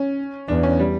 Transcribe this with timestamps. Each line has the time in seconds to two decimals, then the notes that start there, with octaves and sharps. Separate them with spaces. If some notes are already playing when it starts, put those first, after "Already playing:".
Already playing: C#4
0.48 E2 D4
0.63 C#4
0.79 G3